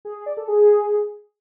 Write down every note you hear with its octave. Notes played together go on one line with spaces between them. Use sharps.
G#4
G#4
D5
A4
G#4